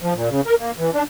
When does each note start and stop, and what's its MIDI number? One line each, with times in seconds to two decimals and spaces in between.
0.02 0.14 53
0.15 0.29 46
0.30 0.41 49
0.46 0.55 70
0.60 0.71 58
0.78 0.91 52
0.93 1.03 62